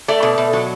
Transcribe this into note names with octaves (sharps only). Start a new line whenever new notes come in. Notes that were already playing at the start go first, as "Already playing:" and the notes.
A3 D5
B2
B2
F#3